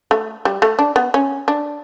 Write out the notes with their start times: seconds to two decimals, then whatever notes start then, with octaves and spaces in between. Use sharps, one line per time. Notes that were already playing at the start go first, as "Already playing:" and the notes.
0.11 A3
0.45 G3
0.62 A3
0.79 D4
0.96 B3
1.14 C#4
1.48 D4